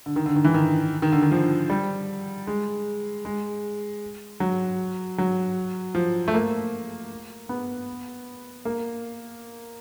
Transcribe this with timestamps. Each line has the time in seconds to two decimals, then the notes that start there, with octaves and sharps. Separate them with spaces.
0.06 D3
0.16 D#3
0.26 D3
0.36 D#3
0.44 E3
0.54 D#3
1.02 D#3
1.13 D3
1.22 D#3
1.31 F3
1.70 G3
2.47 G#3
3.25 G#3
4.40 F#3
5.18 F#3
5.95 F3
6.28 A3
6.34 A#3
7.49 B3
8.65 A#3